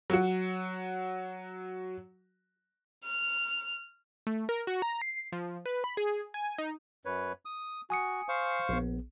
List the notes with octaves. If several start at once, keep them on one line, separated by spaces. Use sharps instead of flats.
F#3 F#4
F6
A3
A#4
F#4
A#5
C7
F3
B4
B5
G#4
G#5
D#4
F#2 B4 C#5
D#6
F#4 G#5 D#6 C#7
C5 F5 C#6
A#1 B3